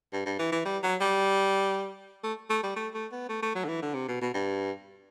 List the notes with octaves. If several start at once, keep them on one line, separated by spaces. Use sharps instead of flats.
G2
G2
E3
E3
G3
F#3
G3
A3
A3
G3
A3
A3
B3
A3
A3
F#3
D3
E3
D3
C3
B2
B2
G2